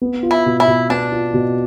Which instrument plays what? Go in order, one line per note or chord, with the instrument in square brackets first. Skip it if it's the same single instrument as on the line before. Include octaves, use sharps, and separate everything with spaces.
[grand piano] B3
F4
[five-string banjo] E4
[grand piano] B2
[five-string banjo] E4
[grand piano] B2
[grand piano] B3 [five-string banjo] D4
[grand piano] F4
B2